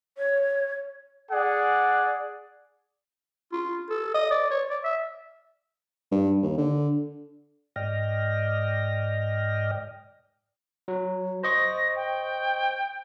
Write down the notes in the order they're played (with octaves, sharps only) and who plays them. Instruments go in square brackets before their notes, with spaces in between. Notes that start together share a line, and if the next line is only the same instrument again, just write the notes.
[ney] C#5
[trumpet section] G#4 D5 F#5
[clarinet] F4
A4
D#5
D5
C#5
D5
E5
[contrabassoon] G2
D#2
D3
[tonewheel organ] G#2 D5 D#5 G5 F6 A#6
[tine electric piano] F#3
[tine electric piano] C5 D#5 C#6 [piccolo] A#6
[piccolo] G5